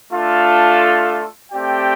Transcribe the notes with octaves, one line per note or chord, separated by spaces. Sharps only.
A3 D4 F4 A4
A3 C4 G4 D5 G5